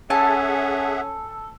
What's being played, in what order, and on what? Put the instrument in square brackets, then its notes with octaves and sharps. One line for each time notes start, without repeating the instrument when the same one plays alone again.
[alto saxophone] C#4 [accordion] G#4 E5 F#5 [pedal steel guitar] A4 [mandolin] G#5 A5